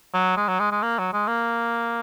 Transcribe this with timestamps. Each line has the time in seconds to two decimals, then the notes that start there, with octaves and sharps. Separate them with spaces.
0.14 F#3
0.37 G#3
0.48 F#3
0.60 G#3
0.72 G#3
0.83 A#3
0.99 F#3
1.13 G#3
1.28 A#3